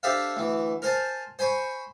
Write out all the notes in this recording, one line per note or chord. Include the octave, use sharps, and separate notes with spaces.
D4 G4 A4 C5 E5 F5
D2 E3
A#4 C5 G#5 A5
C5 G#5 B5 C#6